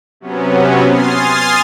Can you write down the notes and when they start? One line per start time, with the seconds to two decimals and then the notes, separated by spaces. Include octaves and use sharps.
0.20 C3 F#3 B3 C#4
0.90 G#5 C6 D#6 F6 A6 C7